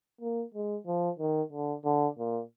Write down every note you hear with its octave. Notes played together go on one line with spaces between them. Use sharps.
A#3
G#3
F3
D#3
D3
D3
A#2